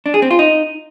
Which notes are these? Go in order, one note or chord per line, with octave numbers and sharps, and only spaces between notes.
D4
G#4
C4
F4
D#4